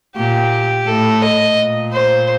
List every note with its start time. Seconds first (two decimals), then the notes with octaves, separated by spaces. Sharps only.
0.17 A#2 G4
0.87 A2 A4
1.22 D#5
1.57 A#2
1.93 C5